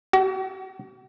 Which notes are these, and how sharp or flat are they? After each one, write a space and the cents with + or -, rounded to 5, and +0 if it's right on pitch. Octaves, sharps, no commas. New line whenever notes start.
F#4 +40